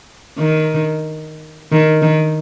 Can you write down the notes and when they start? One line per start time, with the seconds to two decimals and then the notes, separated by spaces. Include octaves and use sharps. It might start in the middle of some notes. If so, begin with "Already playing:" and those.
0.38 D#3
1.72 D#3
2.02 D#3